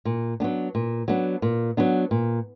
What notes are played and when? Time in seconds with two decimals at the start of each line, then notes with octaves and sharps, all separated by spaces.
0.05 A#2
0.40 F#3 B3 D4
0.75 A#2
1.08 F#3 B3 D4
1.42 A#2
1.77 F#3 B3 D4
2.11 A#2